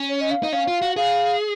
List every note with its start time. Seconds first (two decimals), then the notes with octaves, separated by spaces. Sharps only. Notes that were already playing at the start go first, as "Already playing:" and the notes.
Already playing: C#4
0.09 C#5
0.21 D#5
0.31 F5
0.43 D#4
0.52 C#4 F5
0.68 F4
0.82 F#4
0.96 G#4 F5